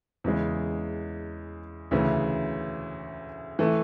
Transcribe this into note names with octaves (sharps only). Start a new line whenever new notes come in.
E2 C#3 G#3
D2 C#3 E3
E3 A3